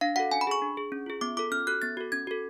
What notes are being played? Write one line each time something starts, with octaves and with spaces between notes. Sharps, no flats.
D4 F5
F#4 A4 F#5
C#4 G#5
B5
G#4 C#6
D4
G#4
C#4
F4 G#4
B3 D6
F4 A4 D6
C#4 F6
F#4 A4 F#6
B3 A6
F#4 A4
C#4 G#6
F#4 A4